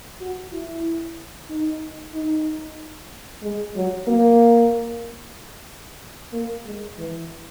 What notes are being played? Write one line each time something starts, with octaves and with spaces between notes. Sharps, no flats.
F#4
E4
D#4
D#4
G#3
F#3
A#3
A#3
G#3
E3